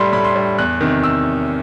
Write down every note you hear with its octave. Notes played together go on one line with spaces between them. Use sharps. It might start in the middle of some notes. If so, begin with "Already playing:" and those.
Already playing: A2 G3 B5 C6
A2 B5
C6
G3
E2 F#6
C3 D#3
E6